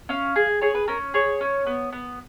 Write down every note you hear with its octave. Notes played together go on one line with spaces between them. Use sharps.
C#4 F5
G#4
G#4 C#5
B4
C#4 A#4
G#4 C#5
C#4
B3
B3